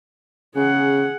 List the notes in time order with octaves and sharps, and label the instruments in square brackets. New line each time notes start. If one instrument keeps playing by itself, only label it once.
[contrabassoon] C#3 [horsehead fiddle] G#4 F#5